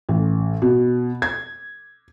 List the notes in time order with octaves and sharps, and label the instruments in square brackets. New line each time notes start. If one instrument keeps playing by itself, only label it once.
[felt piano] A1
B2
G#6